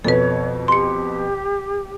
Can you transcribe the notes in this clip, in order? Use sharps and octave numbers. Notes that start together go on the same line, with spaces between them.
F2 B2 A4 B4 C#5
G4 C6 C#7